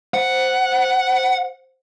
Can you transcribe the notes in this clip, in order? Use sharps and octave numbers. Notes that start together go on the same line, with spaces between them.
C5 F#5